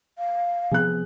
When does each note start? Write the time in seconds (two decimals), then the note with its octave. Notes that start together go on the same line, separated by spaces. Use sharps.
0.18 F5
0.71 C3 F3 B3 G#4 F#6